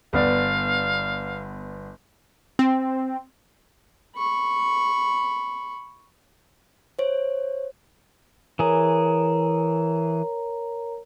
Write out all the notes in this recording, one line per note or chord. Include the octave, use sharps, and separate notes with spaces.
G1 B3 D5 F5
C4
B5 C#6
C5 C#5
E3 G#4 A#4 C#5 A#5